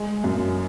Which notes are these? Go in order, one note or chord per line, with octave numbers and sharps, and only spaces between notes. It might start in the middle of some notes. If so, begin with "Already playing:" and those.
Already playing: G#3
F#2